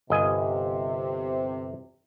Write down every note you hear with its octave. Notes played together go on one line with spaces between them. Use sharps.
G1 C3 D#5 G#5